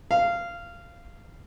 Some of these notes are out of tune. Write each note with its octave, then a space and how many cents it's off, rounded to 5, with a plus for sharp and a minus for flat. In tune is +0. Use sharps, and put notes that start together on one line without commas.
F5 -15